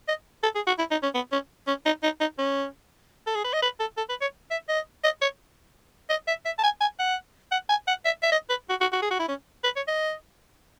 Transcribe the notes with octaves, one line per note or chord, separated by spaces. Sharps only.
D#5
A4
G#4
F#4
E4
D#4
C#4
B3
C#4
C#4
D#4
D#4
D#4
C#4
A4
G#4
B4
D#5
B4
A4
A4
B4
C#5
E5
D#5
D#5
C#5
D#5
E5
E5
A5
G#5
G#5
F#5
F#5
G#5
F#5
E5
E5
D#5
B4
F#4
F#4
F#4
G#4
F#4
E4
C#4
B4
C#5
D#5